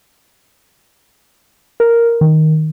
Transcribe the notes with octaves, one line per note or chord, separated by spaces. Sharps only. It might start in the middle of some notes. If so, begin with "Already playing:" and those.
A#4
D#3